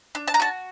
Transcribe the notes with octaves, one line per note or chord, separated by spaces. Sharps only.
D4
A5
A#5
F#4 A5